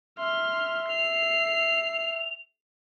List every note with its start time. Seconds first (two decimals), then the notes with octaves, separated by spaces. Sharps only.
0.20 E5 C6 F6
0.89 C7 F7